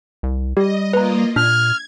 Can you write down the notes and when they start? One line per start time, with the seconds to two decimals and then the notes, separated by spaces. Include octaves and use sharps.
0.23 C2
0.57 G3 G4 D#5
0.93 A#3 F4 B4 D#5 A#5
1.36 A#2 D4 F6 G#6